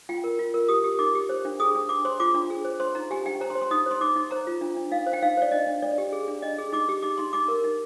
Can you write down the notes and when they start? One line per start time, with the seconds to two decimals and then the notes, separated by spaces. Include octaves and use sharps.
0.09 F4 G5
0.24 A#4
0.39 F4
0.54 A#4
0.68 G4 D#6
0.84 G4
0.99 D#4 D6
1.15 G4
1.29 C5
1.45 D4
1.60 G#4 D#6
1.75 D4
1.89 D4 D6
2.05 C5 C6
2.20 F4 D6
2.34 D4
2.50 G#4
2.65 C5
2.80 C5 C6
2.95 D#4 A#5
3.11 G4 G#5
3.25 D4 G5
3.41 C5 A#5
3.50 C6
3.55 C5
3.61 C6
3.71 D#4 D#6
3.86 C5 C6
4.01 D#4 D6
4.16 D#4
4.31 C5 A#5
4.47 F4
4.61 D4
4.76 D4
4.92 D#4 F5
5.07 C5
5.13 G5
5.22 D#4 F5
5.37 C5 D5
5.52 D4 D#5
5.67 D4
5.82 D4 D5
5.98 G4
6.12 G#4
6.28 D4
6.42 D4 D#5
6.58 G#4
6.72 D#4 D6
6.89 G4
7.03 D#4 D6
7.18 D#4 C6
7.33 D#4 D6
7.48 A#4
7.64 D#4